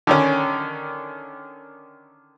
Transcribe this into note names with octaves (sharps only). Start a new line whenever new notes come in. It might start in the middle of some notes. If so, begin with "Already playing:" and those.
D3 D#3 C#4